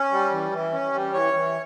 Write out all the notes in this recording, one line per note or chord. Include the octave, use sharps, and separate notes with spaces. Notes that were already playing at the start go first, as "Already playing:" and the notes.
Already playing: C#4
G3
E3
E3
C#4
G3
E3 C#5
E3